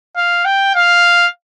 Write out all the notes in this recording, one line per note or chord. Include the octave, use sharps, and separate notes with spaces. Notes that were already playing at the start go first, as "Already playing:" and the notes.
F5
G5
F5